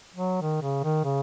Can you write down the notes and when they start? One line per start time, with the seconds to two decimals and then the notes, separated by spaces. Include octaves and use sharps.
0.15 F#3
0.42 D#3
0.62 C#3
0.84 D#3
1.04 C#3